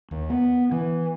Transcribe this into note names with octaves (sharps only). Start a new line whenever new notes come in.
D#2
B3
E3